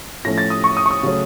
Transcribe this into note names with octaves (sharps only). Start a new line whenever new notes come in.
A2 F3 A3 C#4 A#6
A6
D#6
C#6
D#6
C#6
D#6
C#3 F#3 A3 C#4